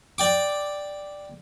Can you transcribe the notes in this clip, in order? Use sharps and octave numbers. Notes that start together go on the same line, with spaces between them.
D5 G5 D6